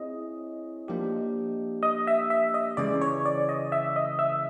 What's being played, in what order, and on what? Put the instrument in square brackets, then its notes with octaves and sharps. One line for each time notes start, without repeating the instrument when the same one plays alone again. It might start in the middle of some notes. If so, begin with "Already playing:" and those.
Already playing: [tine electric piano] C4 E4 G#4 C#5 [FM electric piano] D#5
[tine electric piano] F3 A#3 D4 G4
[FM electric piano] D#5
E5
E5
D#5
[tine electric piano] C#3 E3 G#3 C#4 [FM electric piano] D5
[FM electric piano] C#5
D5
D#5
E5
D#5
E5